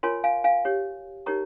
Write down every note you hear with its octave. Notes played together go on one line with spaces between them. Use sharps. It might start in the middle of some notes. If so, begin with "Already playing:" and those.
F4 A#4 C#5 G#5 C6
F5 G#5
F5 G#5
G4 C#5
D#4 G4 A#4 C#5 A#5 C#6